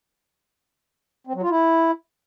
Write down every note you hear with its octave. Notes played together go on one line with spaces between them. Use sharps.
C4
F#3
F4
E4